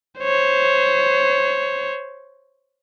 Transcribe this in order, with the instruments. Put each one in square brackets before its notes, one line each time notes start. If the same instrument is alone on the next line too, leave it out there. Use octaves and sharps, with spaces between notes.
[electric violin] C5 C#5